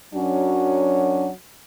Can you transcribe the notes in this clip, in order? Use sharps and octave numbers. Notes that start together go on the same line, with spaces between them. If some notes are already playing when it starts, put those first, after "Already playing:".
F#2 F#3 C#4 D4 F#4